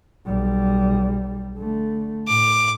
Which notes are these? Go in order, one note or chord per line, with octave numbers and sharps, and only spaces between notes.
B1 G3
D3 A3
A2 D6